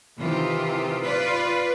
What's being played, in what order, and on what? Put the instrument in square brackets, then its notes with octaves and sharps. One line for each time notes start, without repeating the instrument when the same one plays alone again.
[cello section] C3 D#3 E3 F4 G4
F4 B4 D5